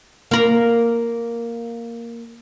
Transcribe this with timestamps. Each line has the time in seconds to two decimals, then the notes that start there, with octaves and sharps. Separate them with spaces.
0.31 A#3 A#4